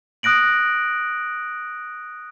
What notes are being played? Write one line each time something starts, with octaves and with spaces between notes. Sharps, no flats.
D#6 F#6 A#6 D7 F#7